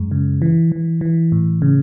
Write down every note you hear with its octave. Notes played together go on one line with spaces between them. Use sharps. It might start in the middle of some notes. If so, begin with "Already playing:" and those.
Already playing: F#2 G#3
C#3
E3
E3
E3
A2
C#3